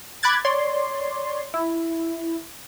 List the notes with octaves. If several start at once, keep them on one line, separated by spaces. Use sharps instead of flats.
B5 D6 F#6 G#6 A6
C#5 D5 C6
E4